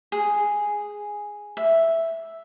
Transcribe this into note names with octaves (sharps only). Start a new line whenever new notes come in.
G#4
E5